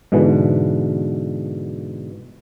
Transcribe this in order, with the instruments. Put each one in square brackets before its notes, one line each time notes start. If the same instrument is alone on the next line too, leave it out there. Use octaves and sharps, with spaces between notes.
[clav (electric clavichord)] G#2 B2 D3 E3